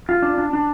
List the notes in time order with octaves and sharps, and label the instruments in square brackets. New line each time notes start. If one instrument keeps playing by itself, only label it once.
[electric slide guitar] F4
D4
D4
D4